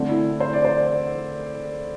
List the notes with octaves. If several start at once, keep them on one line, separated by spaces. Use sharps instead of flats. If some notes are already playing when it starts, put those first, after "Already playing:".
Already playing: D3 A3 C4
E4
C5
D5
C5